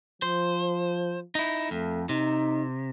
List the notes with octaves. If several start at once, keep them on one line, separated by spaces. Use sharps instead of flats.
F3 C5
D#4 E4
F2 A3
C3 D#4